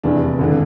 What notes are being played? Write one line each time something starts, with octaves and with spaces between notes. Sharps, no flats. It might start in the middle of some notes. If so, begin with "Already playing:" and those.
F1 E2 C3 D4
G#1 D3